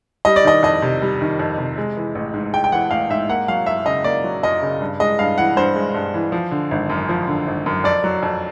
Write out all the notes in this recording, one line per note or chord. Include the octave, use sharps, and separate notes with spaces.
G3 D#5
D5
D#3 D#5
F2 D#5
C3
G3
D#3
F2
C3
G#3
E3
A1
G#2
G#3 G5
G5
E3 F#5
A1 F5
G#2 E5
A#3 F#5
F#3 F5
F#2 E5
C#3 D#5
A#3 D5
F#3
F#2 D#5
C#3
G2
G#3 D#5
G2 F5
E3 F#5
G2 C5
G#3
G2
E3
F3
D3
G#1
F#2
F3
D3
G#1
F#2
F2 D5
F#3
F2